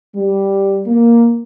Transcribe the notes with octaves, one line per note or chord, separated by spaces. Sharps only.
G3
A#3